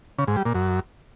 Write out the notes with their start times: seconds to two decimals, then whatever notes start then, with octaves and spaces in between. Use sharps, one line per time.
0.19 C#3
0.28 G#2
0.37 G3
0.46 A#2
0.55 F#2